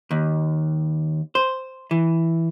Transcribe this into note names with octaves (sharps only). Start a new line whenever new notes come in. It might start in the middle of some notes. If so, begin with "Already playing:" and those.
D#2
C5
E3